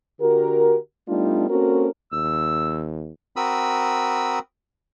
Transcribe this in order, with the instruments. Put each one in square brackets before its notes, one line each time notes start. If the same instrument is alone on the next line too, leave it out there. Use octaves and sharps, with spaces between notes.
[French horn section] D3 F#4 G4 A#4
G3 A3 B3 D4 D#4 F4
A#3 C4 C#4 F#4 A4 A#4
[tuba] D#2 [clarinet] E6
[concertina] C4 F#4 A#4 B5 D#6 E6